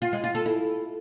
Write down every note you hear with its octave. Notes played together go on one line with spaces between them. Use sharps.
F4
G#3
F4
A4
E4